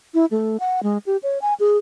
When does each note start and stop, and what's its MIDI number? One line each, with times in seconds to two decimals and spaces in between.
0.14 0.26 64
0.31 0.57 57
0.60 0.83 78
0.83 0.98 56
1.06 1.17 67
1.23 1.38 73
1.42 1.54 80
1.60 1.78 68